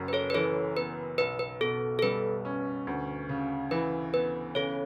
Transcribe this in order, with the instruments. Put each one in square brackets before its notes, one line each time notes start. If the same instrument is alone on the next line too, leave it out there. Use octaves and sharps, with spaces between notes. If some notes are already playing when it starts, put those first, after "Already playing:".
Already playing: [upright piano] F#1 F#2
[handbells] B4
A4 C#5
B4
[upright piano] E3 [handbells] A4 C#5
[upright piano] B3 [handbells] B4
[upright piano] B1 [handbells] B4
[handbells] B4
[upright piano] B2 [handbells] A4
[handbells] A4
[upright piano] G3 [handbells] B4
[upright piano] C#4
D2
C#3
[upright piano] E3 [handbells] B4
[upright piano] B3 [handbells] B4
[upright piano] C#3 [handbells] A4 C#5